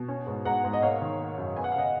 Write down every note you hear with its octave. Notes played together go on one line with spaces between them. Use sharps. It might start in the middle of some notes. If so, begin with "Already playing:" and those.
Already playing: B2
C#4
G#2
G#2 F#5 A#5
G#2
D#5
A#3 C#5 F5
D#3
A#3
F#2
B3 G#5
F#5
F5
C#3 D#5 F#5